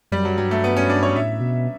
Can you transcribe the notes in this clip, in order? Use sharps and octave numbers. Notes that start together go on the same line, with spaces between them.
F#2 G3
F#3
G2 F#3
A3
B3
C#4
D4
C#5
A2 E5
B2